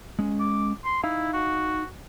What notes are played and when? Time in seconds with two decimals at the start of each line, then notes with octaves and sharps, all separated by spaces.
0.19 G#3 C#4
0.40 D6
0.85 C6
1.04 D#4 E4 F5
1.33 F#4